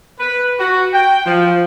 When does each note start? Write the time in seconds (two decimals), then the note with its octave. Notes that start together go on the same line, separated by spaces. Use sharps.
0.19 B4
0.59 F#4
0.93 G5
1.25 F3